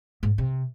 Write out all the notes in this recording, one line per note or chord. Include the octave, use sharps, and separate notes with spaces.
G#2
C3